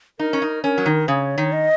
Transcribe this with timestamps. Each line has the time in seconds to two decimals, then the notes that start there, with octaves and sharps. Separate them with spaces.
0.19 D#4 A#4
0.33 C#4
0.42 D#4
0.64 C#4 A#4
0.78 F#3
0.86 D#3
1.08 C#3 C#5
1.38 D#3
1.52 D#5